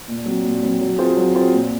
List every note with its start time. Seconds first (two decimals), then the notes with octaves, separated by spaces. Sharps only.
0.08 A#2
0.26 F#3 C4
0.45 A#2
0.63 F#3 C4
0.81 F#3
0.98 C4 F4 G#4 C5
1.17 F#3
1.34 C4 F4 G#4 C5
1.53 A#2